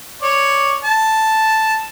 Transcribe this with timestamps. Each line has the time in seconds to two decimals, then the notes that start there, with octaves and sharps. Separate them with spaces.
0.22 C#5 D5
0.84 A5